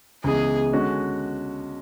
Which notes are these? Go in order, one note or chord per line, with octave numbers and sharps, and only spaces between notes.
C#2 C#3 E3 B3 G#4
D3 G#3 C#4 F#4